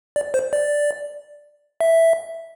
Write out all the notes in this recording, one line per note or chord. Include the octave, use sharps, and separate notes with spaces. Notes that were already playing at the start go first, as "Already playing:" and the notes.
D5
C5
D5
E5